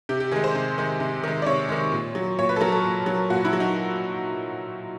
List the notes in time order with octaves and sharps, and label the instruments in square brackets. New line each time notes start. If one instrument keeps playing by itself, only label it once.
[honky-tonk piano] C3 G4
G4
D#3 G#3 G#4
C5
C3
D#3 G#3
C3
D#3 G#3
D5
C3 C#5
D#3 G#3
A#2
F#3
A#2 C#5
B4
A4
F#3 A#4
A4
A#2
F#3
A#2 F#4
E4
F#3
D#4